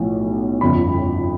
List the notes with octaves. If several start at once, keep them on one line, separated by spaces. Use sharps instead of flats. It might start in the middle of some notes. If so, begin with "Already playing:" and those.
Already playing: B1 A2 F3
G1 F2 C#3 B5